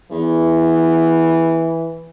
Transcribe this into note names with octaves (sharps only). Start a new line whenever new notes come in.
E2 E3